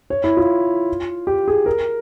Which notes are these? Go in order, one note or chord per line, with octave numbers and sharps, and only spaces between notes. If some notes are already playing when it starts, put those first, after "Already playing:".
C#5
E4
F4
G4
G#4
A#4